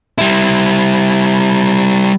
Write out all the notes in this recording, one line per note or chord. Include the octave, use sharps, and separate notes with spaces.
G3 E4